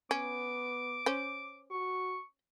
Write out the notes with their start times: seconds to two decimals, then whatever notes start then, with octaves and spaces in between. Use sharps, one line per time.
0.11 B3 C#4 D6
1.06 C#4 C5
1.71 F#4 C#6